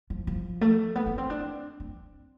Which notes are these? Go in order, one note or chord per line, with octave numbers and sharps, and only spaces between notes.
F3
F3
A3
B3
B3
C4
D4
C4